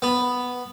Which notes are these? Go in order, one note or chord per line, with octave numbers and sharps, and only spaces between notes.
B3